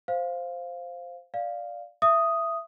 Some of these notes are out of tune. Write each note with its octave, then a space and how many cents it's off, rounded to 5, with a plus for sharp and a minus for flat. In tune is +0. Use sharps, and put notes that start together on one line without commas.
C5 +0 F5 +0
D5 +0 F5 +0
E5 +20 D#6 +0